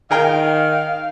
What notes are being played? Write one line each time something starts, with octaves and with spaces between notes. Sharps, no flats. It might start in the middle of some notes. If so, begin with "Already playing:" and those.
D#3 G#4 A#4 F5 G5